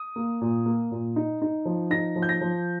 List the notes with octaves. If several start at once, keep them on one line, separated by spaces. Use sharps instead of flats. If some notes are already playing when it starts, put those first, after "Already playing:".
Already playing: D#6
A#3
A#2
A#3
A#2
D#4
D#4
F3
D#4 A#6
F3
G6
A#6
F3